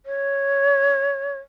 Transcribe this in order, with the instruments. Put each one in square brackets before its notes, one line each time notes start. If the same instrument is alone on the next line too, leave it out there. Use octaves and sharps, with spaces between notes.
[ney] C#5